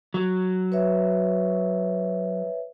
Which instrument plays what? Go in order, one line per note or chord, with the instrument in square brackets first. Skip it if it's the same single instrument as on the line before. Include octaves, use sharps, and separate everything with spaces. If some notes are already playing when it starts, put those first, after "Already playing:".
[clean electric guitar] F#3
[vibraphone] B4 C#5 E5